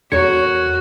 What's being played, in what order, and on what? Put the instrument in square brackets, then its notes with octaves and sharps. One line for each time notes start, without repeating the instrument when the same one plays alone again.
[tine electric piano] E2 G#6 C#7 [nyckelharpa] F#4 [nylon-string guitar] A#4 C5 C#5